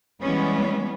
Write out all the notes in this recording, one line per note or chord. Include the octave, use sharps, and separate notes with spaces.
E3 G3 G#3 B3 C#4